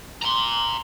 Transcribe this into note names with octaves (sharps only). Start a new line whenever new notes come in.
A#5 C6